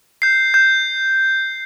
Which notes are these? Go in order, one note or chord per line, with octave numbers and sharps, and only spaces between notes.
G6 C7
G6